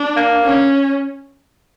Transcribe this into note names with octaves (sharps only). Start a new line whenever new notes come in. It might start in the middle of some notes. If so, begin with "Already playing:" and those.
Already playing: D4
A#3
C#4